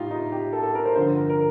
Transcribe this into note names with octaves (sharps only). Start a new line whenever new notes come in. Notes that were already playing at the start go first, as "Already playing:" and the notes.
Already playing: A2 G3 D#4 F4 G4
D#4
G4
A4
A4
A#4
C5
G2 D3 F3 C5
A#4
A#4